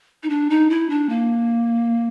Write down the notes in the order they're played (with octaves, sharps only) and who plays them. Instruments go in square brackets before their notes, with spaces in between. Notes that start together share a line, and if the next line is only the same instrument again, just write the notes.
[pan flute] D#4
D4
D#4
E4
D4
A#3